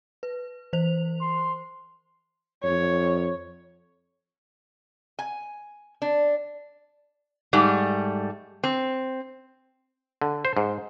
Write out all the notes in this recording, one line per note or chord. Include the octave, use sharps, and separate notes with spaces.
B4
E3 C5 F7
C6
F2 C#5
G#5
D4
G#2 G3 A3
C4
D3
C5
G#2